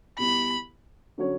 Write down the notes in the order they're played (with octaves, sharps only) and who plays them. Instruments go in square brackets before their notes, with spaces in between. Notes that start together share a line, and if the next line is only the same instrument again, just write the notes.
[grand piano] B2 G3 B3 E4 [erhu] B5
[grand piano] D3 F#3 C#4 F#4 C#5